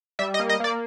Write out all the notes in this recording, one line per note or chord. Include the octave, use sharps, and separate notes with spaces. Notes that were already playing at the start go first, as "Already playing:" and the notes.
G3 E5
D#5
A#3
D#5
A#3 D5